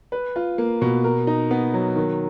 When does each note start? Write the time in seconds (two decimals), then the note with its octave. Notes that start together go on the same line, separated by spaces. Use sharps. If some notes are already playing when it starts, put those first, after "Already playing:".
0.12 B4
0.36 F4
0.58 A#3
0.82 B2
1.04 A#4
1.27 D#4
1.51 B3
1.74 F#3
1.96 D#3